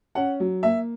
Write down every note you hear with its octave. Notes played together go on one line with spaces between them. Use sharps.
C#4 F#5
F#3
A#3 E5